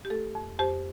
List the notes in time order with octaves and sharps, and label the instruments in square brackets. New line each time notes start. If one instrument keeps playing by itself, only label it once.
[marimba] G4
A3 A4
F2
F2 G4 C5